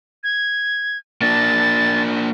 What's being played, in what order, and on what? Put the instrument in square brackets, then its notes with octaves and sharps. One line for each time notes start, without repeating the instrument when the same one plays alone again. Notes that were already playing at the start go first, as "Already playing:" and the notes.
[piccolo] G#6
[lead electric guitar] A#3 D4 [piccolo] A6